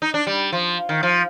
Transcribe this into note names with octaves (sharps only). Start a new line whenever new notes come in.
D#4
D4
G3
F3
D#3
F3